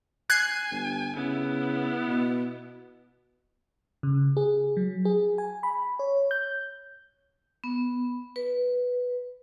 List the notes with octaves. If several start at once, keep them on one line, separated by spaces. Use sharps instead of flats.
G#5 F#6 G#6 C7
G1
C#3 B3 E4
B2
C#3
G#4
F#3
G#4
G#5
B5
C#5
G6
B3
B4